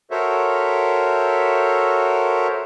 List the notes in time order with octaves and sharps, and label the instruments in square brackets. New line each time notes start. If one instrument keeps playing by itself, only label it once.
[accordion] F#4 A4 A#4 C5 C#5 E5